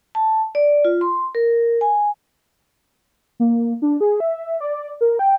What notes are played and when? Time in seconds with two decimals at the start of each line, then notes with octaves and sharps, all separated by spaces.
0.15 A5
0.55 D5
0.85 F4
1.01 C6
1.35 A#4
1.81 G#5
3.40 A#3
3.82 D4
4.01 G#4
4.20 E5
4.60 D5
5.01 A#4
5.19 G5